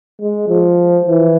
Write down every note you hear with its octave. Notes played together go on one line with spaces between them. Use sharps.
G#3
F3
E3